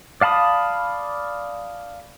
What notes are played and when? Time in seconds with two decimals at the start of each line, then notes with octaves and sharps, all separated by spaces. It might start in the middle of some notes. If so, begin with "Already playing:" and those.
0.21 D5 F5 A5 B5 D#6